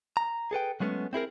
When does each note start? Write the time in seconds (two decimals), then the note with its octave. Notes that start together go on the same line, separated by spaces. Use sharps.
0.17 A#5
0.51 G#4 A4 B4 G5
0.80 F#3 G#3 A3 B3 C#4
1.13 C4 E4 G#4 A#4